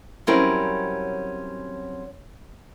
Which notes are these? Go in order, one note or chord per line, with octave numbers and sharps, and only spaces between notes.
F#3 G3 C4 C#4 E4 A#4